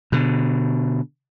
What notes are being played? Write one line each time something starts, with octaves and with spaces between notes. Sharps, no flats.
B2 D3